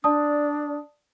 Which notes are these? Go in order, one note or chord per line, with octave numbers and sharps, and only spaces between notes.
D4 D5 A5 D#6